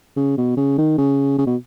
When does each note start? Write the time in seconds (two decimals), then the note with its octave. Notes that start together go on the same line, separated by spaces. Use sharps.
0.16 C#3
0.38 B2
0.57 C#3
0.78 D#3
0.98 C#3
1.38 C#3
1.47 B2